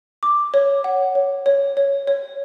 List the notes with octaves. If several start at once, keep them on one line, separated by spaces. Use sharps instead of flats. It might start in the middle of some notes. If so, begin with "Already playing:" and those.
D6
C#5
F#5
C#5
C#5
C#5
C#5